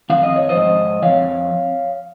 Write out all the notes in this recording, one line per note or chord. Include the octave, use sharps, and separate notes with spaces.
F2 D#3 F5
D#5
C#5
C5 D#5
G#2 F3
F2 D#3 C#5 F5